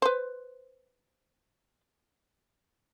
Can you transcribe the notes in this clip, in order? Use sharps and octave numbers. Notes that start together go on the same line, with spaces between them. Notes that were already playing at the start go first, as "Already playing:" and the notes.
B4 C5